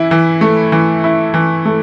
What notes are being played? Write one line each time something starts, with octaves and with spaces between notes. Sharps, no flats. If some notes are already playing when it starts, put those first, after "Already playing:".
Already playing: E3 E4
E3
A3
E3
E4
E3
A3